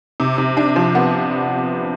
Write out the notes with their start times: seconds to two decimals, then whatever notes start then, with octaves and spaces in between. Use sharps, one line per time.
0.20 C3
0.38 C3
0.57 D4
0.76 F3
0.95 B3